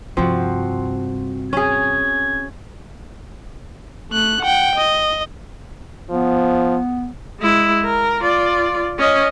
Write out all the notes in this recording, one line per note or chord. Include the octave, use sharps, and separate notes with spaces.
G2 C3 F3 C4 F#4
C#4 G#4 G#6
A3 F#6
F#5 G5
D#5
F3 B3
G#3 E4
A#4
F4 D5
C#4 D#5